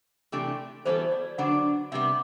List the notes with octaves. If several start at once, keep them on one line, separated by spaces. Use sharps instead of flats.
C3 E3 A3 D4 G4
E3 G3 B3 F#4 A4 C5
D5
D3 F#3 B3 D4 F#5
C3 G3 B3 E5